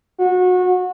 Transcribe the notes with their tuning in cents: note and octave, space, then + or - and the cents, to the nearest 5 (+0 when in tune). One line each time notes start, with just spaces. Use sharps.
F#4 -25